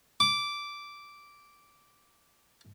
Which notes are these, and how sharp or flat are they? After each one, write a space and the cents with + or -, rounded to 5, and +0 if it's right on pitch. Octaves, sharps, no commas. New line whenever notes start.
D6 -10